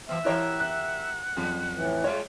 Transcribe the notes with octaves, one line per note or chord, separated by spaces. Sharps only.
E3 B3 E5
E3 E4 G4 A#4 C#5 F#5
F#6
F2 F#3 C#4
A2 E3
G3 G#3 F4 G#4 C#5